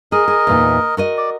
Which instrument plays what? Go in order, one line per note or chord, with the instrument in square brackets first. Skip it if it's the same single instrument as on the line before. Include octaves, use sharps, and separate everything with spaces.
[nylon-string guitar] G#4 [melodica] A#4 D#5
[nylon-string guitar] G#4
E2 A#2 D#4
F#4 A#4 D#5
[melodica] D5